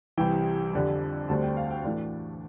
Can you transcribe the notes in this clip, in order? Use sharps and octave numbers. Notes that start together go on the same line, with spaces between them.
C2 C3 E3 G5
F2 D3 G3
D2 D3 G3 C4 A5
G5
F5
G5
A2 E3 A3 D4